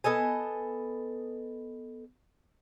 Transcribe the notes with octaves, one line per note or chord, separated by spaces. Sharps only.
B3 A4 D#5 G#5